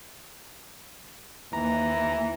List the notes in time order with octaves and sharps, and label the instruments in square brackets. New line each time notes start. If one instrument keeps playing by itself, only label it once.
[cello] D#2 [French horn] E3 [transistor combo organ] A#5